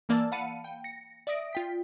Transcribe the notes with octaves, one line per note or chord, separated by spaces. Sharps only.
E3 A#3 D5 A5 E6 A6
F5 F#5 A5 B5 C#7 D#7
G5
A#6 C#7
D5 E5 D#6 A#6 D7
F4 G5 B6